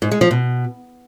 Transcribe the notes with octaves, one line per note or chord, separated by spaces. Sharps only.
G#2
G#3
F3
B2